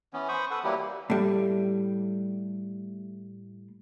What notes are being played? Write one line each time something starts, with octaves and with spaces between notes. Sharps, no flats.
E3 B3 C#4
C5 B5 C#6 D#6
A4 B4 F#5
E3 F#3 G3 A#3 E4 G4
A2 G3